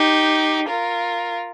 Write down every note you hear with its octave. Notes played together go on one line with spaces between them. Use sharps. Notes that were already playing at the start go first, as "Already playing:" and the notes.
Already playing: D#4 G4
F4 A#4